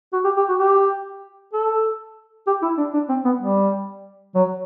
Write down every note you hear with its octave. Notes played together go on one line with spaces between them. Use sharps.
F#4
G4
G4
F#4
G4
A4
G4
E4
D4
D4
C4
B3
G3
F#3